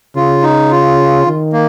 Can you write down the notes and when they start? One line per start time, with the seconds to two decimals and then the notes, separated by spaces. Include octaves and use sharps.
0.16 C#3 F4
0.43 D#4
0.71 F4
1.26 D#3
1.53 A#3